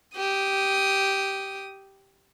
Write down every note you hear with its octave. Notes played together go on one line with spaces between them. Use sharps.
G4 D#6